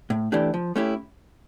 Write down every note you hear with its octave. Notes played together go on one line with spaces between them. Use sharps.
A2
E3 A3 D4 G4
F3
A3 C#4 E4 G4